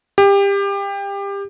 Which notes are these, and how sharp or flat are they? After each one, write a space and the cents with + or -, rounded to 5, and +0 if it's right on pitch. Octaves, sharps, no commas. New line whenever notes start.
G4 +25